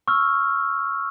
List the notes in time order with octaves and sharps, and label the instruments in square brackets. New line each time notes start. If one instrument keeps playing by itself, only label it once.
[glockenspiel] C#6 E6 F6